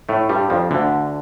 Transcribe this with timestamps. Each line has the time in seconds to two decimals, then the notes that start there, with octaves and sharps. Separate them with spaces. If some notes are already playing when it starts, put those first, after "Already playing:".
0.09 A2 A3
0.29 G2 G3
0.50 F2 F3
0.71 D2 D3